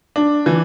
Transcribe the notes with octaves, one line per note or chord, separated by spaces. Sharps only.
D4
E3